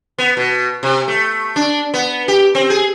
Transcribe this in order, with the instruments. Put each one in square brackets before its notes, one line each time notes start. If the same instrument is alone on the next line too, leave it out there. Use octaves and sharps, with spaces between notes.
[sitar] B3
B2
C3
A3
D4
B3
G4
C4
G#4